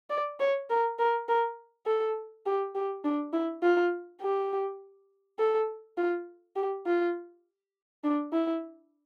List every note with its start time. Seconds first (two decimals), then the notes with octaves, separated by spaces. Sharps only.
0.10 D5
0.40 C#5
0.70 A#4
0.99 A#4
1.28 A#4
1.86 A4
2.46 G4
2.75 G4
3.05 D4
3.33 E4
3.63 F4
4.22 G4
5.39 A4
5.98 F4
6.56 G4
6.87 F4
8.04 D4
8.33 E4